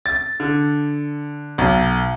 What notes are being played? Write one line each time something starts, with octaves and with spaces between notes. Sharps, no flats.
A6
D3
B1